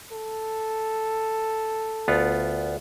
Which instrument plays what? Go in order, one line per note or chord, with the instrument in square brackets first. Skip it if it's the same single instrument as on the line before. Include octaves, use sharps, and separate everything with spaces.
[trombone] A4
[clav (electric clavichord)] D2 B3 F4